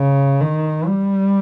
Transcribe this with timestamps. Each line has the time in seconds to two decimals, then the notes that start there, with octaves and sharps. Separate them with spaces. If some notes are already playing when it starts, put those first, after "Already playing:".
Already playing: C#3
0.41 D#3
0.87 G3